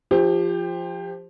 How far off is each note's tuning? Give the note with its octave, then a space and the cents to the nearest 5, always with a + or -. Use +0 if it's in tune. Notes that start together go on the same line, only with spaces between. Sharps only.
F3 +0 G4 +25 C5 +0